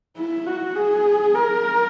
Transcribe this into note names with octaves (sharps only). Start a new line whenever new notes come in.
E4
F#4
G#4
A#4